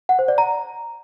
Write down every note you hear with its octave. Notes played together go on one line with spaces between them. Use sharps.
F#5
C5
D5
A#5